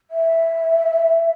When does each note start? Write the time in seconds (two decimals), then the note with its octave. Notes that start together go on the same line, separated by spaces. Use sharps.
0.11 E5